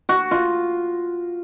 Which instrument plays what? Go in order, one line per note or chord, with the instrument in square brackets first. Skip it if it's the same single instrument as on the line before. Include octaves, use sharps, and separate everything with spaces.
[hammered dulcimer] F#4
F4